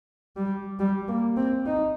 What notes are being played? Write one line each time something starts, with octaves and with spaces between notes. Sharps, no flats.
G3
G3
A#3
C4
D#4